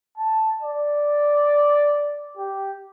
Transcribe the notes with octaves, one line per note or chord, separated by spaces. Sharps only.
A5
D5
G4